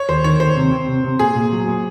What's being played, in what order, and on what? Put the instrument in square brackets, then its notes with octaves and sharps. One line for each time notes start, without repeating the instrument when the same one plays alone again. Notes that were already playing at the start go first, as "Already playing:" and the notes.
Already playing: [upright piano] C#5
[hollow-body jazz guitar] D#2 [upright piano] C5
[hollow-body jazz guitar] D#3 [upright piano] C#5
[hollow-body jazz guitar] D#2 [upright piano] C5
[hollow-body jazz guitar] C3
C4
C3
C3
[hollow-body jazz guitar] A#2 [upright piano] G#4
[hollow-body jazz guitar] A#2
F#3
A#2